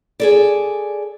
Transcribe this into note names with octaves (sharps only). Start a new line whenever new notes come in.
G#4 A4 D5